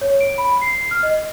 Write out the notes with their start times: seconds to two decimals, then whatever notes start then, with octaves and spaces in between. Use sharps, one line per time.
0.01 C#5
0.21 D7
0.38 B5
0.61 C7
0.91 F6
1.03 D#5